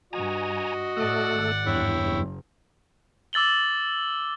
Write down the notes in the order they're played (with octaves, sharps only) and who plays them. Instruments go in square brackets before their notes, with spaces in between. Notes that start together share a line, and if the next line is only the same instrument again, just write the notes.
[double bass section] G2 [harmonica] F#4 D#5 [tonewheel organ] G#5 A#5
[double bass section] A2 [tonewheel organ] A3 A4 [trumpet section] D5 F#5
[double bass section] G#1
[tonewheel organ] E2 G2 [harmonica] E4 C#5 G5
[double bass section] F#1
[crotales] D6 E6 A6 F#7 G7